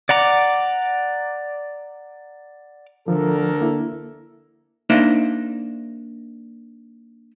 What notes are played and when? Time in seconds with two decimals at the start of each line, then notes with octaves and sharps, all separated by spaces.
0.09 D5 F#5 A#5 D6
3.08 D2 D3 F3 A4 A#4
3.61 A#3 E4
4.90 A#3 D4 D#4 C5 E5